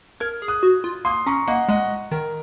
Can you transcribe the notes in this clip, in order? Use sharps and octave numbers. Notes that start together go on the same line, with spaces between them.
A#4 F6 G#6
G#4
D#6 F#6
F#4
F4
A#3 C6 D#6
C#4 A#5 C#6
A#3 D#5 F#5
G#3 D#5 F#5
D#3 A#4